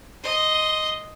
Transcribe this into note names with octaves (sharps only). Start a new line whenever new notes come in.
D#5 C6